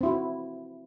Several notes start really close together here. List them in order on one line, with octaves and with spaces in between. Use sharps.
C4 E4 F#4